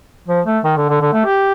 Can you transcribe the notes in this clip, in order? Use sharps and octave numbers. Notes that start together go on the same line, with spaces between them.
F3
A3
D#3
D3
D3
D3
A3
G4